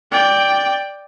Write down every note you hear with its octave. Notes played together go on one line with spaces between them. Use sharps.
D5 G5